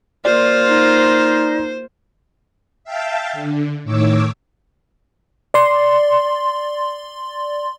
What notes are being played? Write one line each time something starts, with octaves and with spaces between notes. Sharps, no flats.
A#3 F4 C5 D5
D#4
E5 F5 G5 A5
D3
A2 D#3 C#5 D6 E6
D5 C6